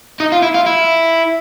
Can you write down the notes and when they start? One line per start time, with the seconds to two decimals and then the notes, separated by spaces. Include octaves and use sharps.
0.20 D#4
0.32 F4
0.42 E4
0.54 F4
0.66 E4